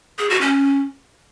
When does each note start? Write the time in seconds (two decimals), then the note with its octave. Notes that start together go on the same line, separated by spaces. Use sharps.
0.19 G#4
0.30 F#4
0.41 C#4